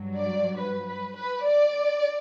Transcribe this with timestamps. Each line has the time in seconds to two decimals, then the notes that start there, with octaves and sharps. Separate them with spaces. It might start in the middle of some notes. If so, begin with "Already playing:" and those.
Already playing: G2 F#3
0.17 D5
0.60 B4
0.88 B4
1.17 B4
1.45 D5